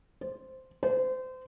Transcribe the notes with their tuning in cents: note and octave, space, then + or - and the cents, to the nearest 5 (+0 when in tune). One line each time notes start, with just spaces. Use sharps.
C5 -5
C5 -30